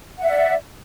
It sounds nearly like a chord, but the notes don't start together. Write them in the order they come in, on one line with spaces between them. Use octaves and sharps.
F#5 E5 D5